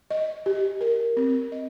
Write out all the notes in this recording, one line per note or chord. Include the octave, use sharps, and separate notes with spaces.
D#5
G4
A#4
C4
D#5